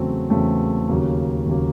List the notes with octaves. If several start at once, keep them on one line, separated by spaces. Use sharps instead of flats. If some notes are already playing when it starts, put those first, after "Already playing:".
Already playing: E2 C#3 F#3 A3 C4
E2 C#3 F#3 A3 C4
D#2 C#3 F#3 A#3
D#2 C#3 F#3 A#3